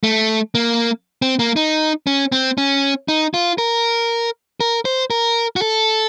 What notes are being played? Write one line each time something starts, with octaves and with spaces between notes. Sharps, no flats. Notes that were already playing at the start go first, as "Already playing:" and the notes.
A3
A#3
C4
A#3
D#4
C#4
C4
C#4
D#4
F4
A#4
A#4
C5
A#4
F#4
A4